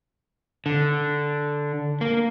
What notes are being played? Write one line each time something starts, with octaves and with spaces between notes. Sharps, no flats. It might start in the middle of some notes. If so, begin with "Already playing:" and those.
D3
A#3